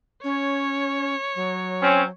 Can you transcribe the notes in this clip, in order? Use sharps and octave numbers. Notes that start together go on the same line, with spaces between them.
C#4 C#5
F#3
C4 C#4